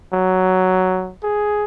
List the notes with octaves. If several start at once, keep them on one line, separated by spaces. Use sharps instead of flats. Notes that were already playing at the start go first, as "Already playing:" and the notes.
F#3
G#4